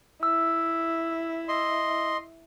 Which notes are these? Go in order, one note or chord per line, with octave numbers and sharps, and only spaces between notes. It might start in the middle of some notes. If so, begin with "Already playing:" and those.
E4 E6
D#5 C6